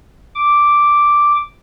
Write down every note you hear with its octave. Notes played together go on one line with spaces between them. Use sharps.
D6